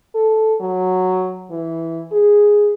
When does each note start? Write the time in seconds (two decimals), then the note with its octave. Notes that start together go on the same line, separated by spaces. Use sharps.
0.15 A4
0.61 F#3
1.51 E3
2.12 G#4